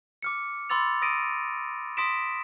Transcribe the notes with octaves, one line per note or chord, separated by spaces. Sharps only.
D6 F6 C#7
B5 C6 D6 E6 A6 F7
D#6 A#6 D7 D#7
C6 D#6 A#6 B6 D7 E7